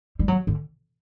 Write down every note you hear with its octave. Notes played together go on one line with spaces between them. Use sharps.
G3
F#3
D3